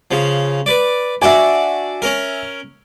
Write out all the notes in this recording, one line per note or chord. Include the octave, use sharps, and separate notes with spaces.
C#3 F3
B4 D5
D4 F#4 D5 E5 G#5
C#4 A#4